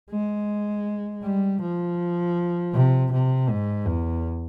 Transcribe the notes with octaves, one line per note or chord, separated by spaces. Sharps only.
G#3
G3
F3
C3
C3
G#2
E2